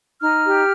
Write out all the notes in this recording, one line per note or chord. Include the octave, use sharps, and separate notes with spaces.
D#4 F6
G4